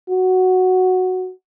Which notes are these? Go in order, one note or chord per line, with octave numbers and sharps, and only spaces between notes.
F#4